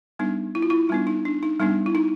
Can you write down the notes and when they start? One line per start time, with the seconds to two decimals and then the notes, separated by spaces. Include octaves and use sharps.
0.19 G3 B3 D4 D#4
0.55 E4
0.62 F4
0.70 E4
0.89 G3 B3 D4 D#4
1.07 D#4
1.25 D4
1.43 D#4
1.60 G3 B3 D4 D#4
1.86 E4
1.95 D#4